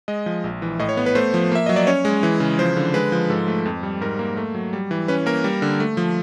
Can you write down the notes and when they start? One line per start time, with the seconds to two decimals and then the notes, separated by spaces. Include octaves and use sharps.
0.08 G#3 D#5
0.26 F3
0.44 A#1
0.62 E3
0.79 A2 D#5
0.89 C#5
0.97 B3
1.06 B4
1.15 A3 C5
1.34 F3
1.52 A#3 E5
1.66 F#3 D#5
1.76 D5
1.87 C#4 C#5
2.05 G#3
2.23 E3
2.40 C#3
2.59 F3 C5
2.77 D3
2.94 G#3 B4
3.12 F3
3.30 G#2 A4
3.48 A3
3.65 F2
3.83 G3
4.01 G#2 A#4
4.19 A#3
4.37 A3
4.55 F#3
4.73 G3
4.91 E3
5.08 C#4 B4
5.26 A#3 A#4
5.44 G3
5.62 D3
5.80 A3
5.97 F3